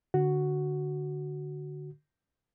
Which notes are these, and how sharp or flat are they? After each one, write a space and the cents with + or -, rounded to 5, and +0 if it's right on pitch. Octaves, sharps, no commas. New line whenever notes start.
D3 +0 F#4 +0